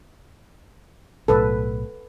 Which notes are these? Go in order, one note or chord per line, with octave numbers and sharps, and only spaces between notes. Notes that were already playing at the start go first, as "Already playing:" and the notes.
B1 A2 A4 B4